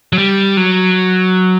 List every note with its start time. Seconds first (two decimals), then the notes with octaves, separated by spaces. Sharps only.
0.13 F#3
0.18 G3
0.57 F#3